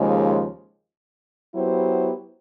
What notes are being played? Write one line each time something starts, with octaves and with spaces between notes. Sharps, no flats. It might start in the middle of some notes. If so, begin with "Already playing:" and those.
Already playing: D#2 C#3 F3 G#3
F#3 B3 E4 G4 C5